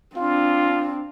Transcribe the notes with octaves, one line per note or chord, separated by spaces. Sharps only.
C4 D4 F4